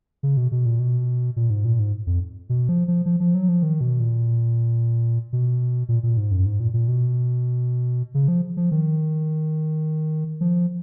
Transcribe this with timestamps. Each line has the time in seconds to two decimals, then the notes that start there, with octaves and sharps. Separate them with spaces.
0.23 C#3
0.37 B2
0.52 B2
0.66 A#2
0.79 B2
1.36 A#2
1.50 G#2
1.65 A#2
1.79 G#2
2.07 F2
2.49 B2
2.69 F3
2.88 F3
3.06 F3
3.20 F3
3.35 F#3
3.48 F3
3.63 D#3
3.81 B2
4.00 A#2
5.33 B2
5.89 A#2
6.03 A#2
6.17 G#2
6.31 F#2
6.46 G#2
6.60 A#2
6.74 A#2
6.88 B2
8.14 C#3
8.28 F3
8.57 F3
8.71 D#3
10.41 F3